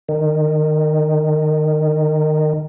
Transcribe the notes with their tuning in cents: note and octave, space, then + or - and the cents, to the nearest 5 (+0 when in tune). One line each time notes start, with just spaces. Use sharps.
D#3 -20